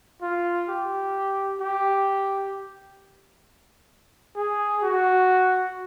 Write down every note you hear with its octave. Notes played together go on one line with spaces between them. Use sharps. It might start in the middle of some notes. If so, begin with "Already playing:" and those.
F4
G4
G4
G#4
F#4